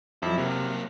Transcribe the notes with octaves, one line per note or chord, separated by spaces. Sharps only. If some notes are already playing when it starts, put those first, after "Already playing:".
F2 F#3 E4
C3 F#3 A#3